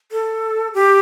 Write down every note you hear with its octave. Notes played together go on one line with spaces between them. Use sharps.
A4
G4